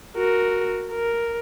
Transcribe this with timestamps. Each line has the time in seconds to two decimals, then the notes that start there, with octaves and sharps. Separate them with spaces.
0.16 F#4 A#4
0.90 A#4